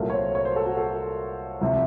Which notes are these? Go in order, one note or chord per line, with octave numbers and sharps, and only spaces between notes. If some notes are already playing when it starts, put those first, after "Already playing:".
Already playing: C2 A#2 F#3 A3 A#4
C#5
C5
C#5
C5
A4
F#4
A4
C2 C3 F3